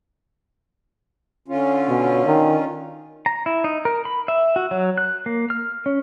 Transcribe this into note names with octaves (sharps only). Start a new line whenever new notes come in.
D3 C#4 F4
B2
D#3
A#5
E4
D#4
A#4
B5
E5
F#4
F#3
F#6
A#3
F6
C#4